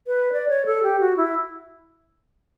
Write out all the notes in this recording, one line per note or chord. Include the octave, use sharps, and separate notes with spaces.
B4
D5
C#5
A4
G4
F#4
E4